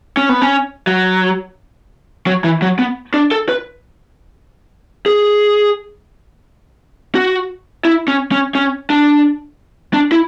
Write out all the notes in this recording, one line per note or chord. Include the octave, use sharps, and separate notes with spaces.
C#4
B3
C#4
F#3
F#3
E3
F#3
B3
D4
A4
B4
G#4
F#4
E4
C#4
C#4
C#4
D4
D4
E4